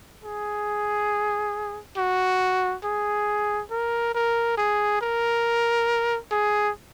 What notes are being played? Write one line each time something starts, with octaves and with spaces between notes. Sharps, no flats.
G#4
F#4
G#4
A#4
A#4
G#4
A#4
G#4